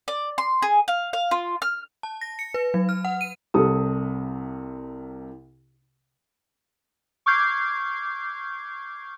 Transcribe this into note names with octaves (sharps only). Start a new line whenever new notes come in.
D5
C6
G#4
F5
F5
F4
F6
A5
A#6
C#7
B4
F#3
F6
F#5
D#7
C2 C3 A4 D#6
C#6 D6 F6 G6 G#6 C7